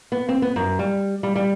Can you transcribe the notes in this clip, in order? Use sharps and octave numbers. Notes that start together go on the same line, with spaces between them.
B3
C4
B3
F#2
G3
G3
G3